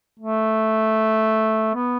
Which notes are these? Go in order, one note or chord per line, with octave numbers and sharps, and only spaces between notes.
A3
B3